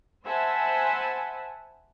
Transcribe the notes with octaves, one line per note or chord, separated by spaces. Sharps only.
C5 E5 F#5 G#5 A5 B5